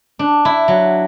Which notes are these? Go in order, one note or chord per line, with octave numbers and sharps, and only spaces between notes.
D4
E4
F#3